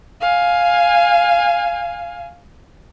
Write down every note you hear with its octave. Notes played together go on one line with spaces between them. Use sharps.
F5 G#5